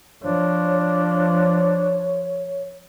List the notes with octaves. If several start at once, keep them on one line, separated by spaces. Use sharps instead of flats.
F3 D4 C#5